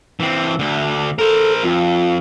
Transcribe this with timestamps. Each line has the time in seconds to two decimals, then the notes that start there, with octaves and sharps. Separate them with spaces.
0.20 E3 C4
0.59 D2 D3
1.19 A4 A#4 C5
1.63 F2 F4